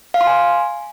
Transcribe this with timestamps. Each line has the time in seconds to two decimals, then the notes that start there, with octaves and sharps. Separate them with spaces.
0.14 F5
0.21 C6
0.27 G#5